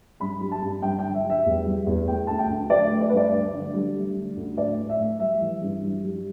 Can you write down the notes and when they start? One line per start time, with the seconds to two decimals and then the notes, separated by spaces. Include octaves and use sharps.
0.20 G2 B5
0.41 G3
0.52 A5
0.62 G2
0.82 G2 G5
0.99 G5
1.04 D3
1.14 E5
1.24 G3
1.30 E5
1.45 E2
1.65 G3
1.86 E2
2.08 A3 G5
2.27 D2 A5
2.39 G5
2.50 D2
2.70 A3 D5
2.91 A3
3.01 D5
3.09 G2 B4
3.17 D5
3.32 D2
3.53 D3
3.74 G3
3.95 A3
4.16 D3
4.37 D2
4.57 A2 D5
4.78 A2
4.89 E5
4.99 A3
5.19 G3 E5
5.41 E3
5.62 G2
5.82 G3
6.04 G3